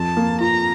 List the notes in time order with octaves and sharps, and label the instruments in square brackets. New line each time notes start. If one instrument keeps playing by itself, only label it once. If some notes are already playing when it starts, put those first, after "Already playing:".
Already playing: [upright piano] F2 [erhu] A5
[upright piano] A#3
[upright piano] F4 [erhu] A#5